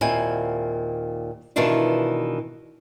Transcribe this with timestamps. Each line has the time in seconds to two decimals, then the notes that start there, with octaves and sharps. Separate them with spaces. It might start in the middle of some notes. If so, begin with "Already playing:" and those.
0.01 D#2 A#2 C4 E4 G#5
1.56 B2 D#3 E3 D4 F4